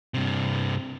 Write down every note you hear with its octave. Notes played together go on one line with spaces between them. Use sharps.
G2 C3